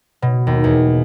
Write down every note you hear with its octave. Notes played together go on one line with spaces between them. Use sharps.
B2
D#2
E2